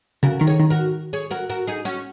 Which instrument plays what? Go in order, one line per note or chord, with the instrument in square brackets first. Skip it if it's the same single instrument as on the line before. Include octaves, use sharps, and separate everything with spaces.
[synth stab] C#3 [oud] F#4 A#4
[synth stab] D#3 [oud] A#4
[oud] G#4 C#5
[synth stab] D#3
[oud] F#4 A#4
G#4 C#5
F#4 A#4
F#4 A#4
D#4 G#4
C#4 F#4